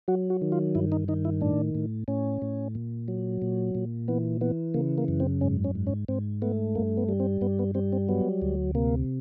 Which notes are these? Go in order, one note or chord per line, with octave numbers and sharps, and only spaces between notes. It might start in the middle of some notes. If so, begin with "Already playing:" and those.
F#3 F#4
F#4
D#3
F4
G2 E4
D#4
D#3 D#4
E4
A2 D4
A2
A2 C#4
A2
A#2
F#3
A#2
A#2
E3 B3
E3 B3
C#3 A#3
A#3
F#2
C4
G#2 C#4
C#4
G#2
C#4
G#2 C4
A3 B3
G2 A#3
B3
G3
C4
G2 B3
B3
G3 C4
C4
F#3 B3
D2
C3 A#3